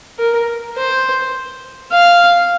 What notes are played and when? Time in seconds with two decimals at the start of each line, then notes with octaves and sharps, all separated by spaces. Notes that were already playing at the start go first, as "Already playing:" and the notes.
0.19 A#4
0.77 C5
1.92 F5